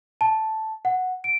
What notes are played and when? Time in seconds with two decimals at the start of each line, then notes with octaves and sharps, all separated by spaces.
0.21 A5
0.85 F#5
1.24 D7